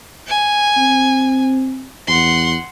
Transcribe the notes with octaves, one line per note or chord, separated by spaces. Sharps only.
G#5
C4
E2 F#5 C6